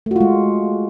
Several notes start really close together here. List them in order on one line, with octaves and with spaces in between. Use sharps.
A3 F#4 F4 G#3